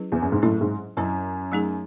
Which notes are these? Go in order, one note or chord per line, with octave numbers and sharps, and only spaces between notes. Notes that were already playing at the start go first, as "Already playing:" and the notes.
Already playing: F#3 C#4 E4 G#4 B4
E2
F#2
G#2
A2 F#3 C#4 E4
G#2
F#2 F#3 C#4 E4
F#3 A3 D#4 G#4